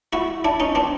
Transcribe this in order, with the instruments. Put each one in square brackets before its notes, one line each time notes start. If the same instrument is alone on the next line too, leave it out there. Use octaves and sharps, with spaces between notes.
[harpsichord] E4 F#4
D4 E4
C#4 D#4
C4 D4